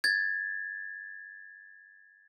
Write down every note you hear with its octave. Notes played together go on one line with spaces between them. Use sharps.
G#6 A6